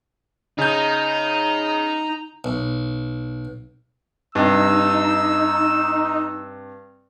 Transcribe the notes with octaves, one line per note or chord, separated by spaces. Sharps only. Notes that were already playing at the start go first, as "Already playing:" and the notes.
C#3 D#4 A#5 G6
B1
G2 C3 D#4 E6